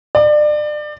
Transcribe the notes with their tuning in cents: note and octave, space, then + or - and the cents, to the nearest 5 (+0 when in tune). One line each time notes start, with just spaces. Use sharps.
D5 +30